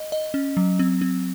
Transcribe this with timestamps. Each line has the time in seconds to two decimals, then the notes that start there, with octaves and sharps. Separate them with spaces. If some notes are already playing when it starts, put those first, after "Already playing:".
Already playing: D#5
0.12 D#5
0.34 C#4
0.57 F#3
0.79 C4
1.01 C4